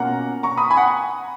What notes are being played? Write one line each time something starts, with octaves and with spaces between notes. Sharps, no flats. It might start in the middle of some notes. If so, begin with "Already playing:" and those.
Already playing: B2 A#3 C#4 F4 F#5 A#5
A#5 C#6
B5 D#6
G#5 B5
F#5